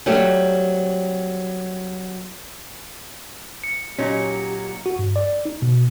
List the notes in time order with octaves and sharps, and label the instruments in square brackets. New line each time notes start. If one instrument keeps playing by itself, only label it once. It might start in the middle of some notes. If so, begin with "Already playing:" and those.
[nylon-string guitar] F#3 G3 A3 C4 G4
[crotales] C#7
[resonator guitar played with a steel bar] A#2 F#3 D#4 [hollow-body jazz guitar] C#4 [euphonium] G4
[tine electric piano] F#4
G2
D5
D#4
B2